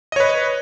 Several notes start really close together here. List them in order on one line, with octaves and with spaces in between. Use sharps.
D#5 C#5 B4